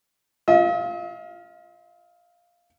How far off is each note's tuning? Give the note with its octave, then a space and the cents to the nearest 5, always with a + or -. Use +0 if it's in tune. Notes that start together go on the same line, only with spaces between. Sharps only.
F4 +0 D#5 +45